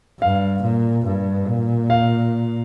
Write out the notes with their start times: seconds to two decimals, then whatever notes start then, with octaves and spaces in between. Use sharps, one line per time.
0.21 G2 F5
0.63 A#2
1.06 G2
1.47 A#2
1.90 F5